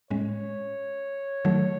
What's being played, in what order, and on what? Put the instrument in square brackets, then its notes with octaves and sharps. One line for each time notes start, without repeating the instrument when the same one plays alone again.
[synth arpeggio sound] A2 G#3 C#4 [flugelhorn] C#5
[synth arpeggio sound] D#3 F#3 A3